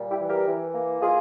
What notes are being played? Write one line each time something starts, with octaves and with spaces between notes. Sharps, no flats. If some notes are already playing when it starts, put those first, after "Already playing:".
Already playing: A#2 G3
E4 G4
E3
G4 A#4
E3
A#3
F4 G#4